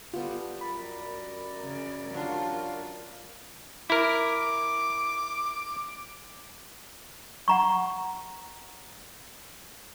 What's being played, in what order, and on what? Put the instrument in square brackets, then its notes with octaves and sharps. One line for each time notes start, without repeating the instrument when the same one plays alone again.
[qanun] G3 B3 G4 [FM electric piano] F4 [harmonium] A4
[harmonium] F#2 A#4 D5 [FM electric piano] B5
[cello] C#3
[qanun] F#3 D4 G4 [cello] F4
[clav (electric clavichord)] E4 A#4 [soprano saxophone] D6
[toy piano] F#5 A#5 C#6